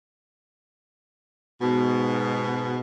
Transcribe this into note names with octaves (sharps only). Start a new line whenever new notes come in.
G#2 B2